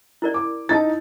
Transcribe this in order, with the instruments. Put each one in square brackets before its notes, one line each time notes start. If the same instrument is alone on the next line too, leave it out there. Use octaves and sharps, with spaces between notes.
[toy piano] E4 A#4 D5
[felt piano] D6
[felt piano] D#4 A6 [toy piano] E4 A5